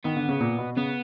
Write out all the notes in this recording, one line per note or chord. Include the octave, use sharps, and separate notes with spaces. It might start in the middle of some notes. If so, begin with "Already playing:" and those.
D#3 B3
D3
C#3
A#2
B2
C#3 B3